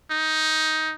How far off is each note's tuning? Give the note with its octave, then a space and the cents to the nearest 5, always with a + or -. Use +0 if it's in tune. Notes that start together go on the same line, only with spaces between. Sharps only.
D#4 +10